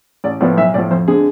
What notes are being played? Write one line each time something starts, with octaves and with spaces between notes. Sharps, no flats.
A1 D5
A2 F3 B3 D5
B1 E5
A2 F3 D5
F2 C5
D3 G#3 C4 G#4